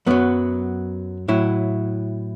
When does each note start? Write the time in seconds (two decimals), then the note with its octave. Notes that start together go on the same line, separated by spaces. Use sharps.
0.06 F#2 F#3 B3
1.28 A2 F#3 E4